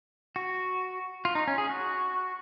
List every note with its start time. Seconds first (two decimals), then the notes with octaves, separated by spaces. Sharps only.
0.36 F#4
1.25 F4
1.35 D#4
1.47 C#4
1.58 G#4
1.69 F#4